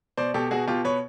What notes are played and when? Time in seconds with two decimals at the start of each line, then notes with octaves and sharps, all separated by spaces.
0.17 B2 C5 D5
0.34 B2 G4 A4
0.51 B2 F#4 G#4
0.68 B2 F4 G4
0.84 B2 B4 C#5